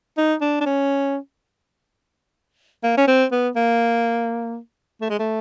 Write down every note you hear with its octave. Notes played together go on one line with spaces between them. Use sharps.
D#4
D4
D4
C#4
A#3
C#4
C4
B3
A#3
A3
G#3
A3